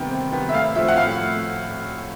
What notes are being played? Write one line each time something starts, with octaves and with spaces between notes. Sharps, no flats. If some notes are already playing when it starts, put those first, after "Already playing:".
Already playing: C3 D#3 G3 B3 G5
C3
D#3 G3 B3
E5
A2 F5
F3 A3 C4 E5
F#5
A2 F5